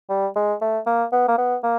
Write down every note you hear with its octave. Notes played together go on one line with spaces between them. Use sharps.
G3
G#3
A3
A#3
B3
A#3
B3
A#3